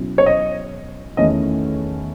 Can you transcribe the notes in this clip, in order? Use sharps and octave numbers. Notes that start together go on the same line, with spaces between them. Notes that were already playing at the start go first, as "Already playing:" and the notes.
Already playing: B2 F#3 C#4 E4
C#5
D#5
E2 D#3 A3 C#4 E4 D#5